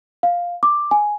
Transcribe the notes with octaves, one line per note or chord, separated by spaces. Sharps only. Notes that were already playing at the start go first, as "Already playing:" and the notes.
F5
D6
G#5